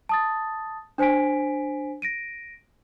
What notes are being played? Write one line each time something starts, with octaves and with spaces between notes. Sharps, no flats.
A5 D#6 A6
D4 C5 G#5 B6 D7
A#6 D7 D#7